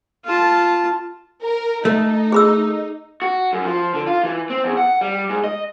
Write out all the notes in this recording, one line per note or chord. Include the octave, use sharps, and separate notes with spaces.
F4 A5
A#4
A3 D#4
G#4 B5 E6
F#4
F#2
F3
D3
F4
E3
C4
E2
F#5
G3
G#2
D#5